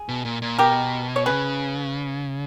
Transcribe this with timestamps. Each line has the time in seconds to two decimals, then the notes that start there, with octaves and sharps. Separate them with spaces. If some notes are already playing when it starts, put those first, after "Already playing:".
Already playing: G#4
0.09 B2
0.25 A#2
0.42 A#2
0.58 B2 G4 A#4
1.16 C#5
1.26 C#3 G#4 B4